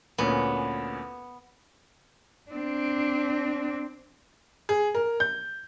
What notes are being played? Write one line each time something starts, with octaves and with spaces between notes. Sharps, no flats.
D2 A#2 B3 C#4
C4 D4
G#4
A#4
G6